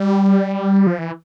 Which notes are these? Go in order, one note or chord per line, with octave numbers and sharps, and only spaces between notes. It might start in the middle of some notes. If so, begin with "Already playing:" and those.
Already playing: G3
F3
E3